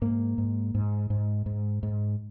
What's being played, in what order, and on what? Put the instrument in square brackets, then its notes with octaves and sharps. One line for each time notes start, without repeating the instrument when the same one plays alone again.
[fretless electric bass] G#2 A#3
G#2
G#2
G#2
G#2
G#2